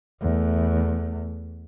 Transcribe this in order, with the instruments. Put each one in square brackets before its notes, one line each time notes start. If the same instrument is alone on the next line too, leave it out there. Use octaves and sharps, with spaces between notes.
[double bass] E2 A3